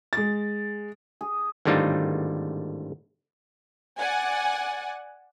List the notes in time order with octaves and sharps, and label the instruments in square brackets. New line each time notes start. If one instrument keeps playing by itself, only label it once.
[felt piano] G#3 A6
[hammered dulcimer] G#4
[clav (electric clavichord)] G#1 A2 D3 G3 D#4 F4
[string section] D5 F#5 G#5